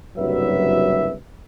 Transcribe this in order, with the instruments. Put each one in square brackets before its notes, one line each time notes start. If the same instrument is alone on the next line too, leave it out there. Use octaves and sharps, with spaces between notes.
[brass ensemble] F#1 C2 G2 F#3 B4 E5